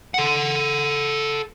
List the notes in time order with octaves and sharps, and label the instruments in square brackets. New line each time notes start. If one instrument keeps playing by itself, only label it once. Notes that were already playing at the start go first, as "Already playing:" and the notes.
[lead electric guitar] A4 F#5